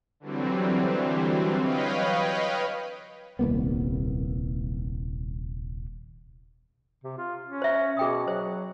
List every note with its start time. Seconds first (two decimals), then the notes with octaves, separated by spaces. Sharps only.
0.20 D3 E3 F#3 G3 C4
1.60 B4 C#5 D#5 F5 G5 B5
3.39 D#1 C2 A#3 B3
7.04 C3
7.18 F4
7.46 C#4
7.62 C5 E5
7.97 B2 G#4 G5 D#6
8.28 F#3 C5